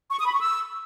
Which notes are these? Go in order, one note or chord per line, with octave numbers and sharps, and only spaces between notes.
C#6
D#6
B5
C#6
E6